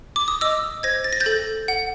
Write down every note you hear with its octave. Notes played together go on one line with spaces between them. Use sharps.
D6
D#6
D#5 D6 E6
C5 G#6 A#6
A6
A#6
G6 A6
A4
F#5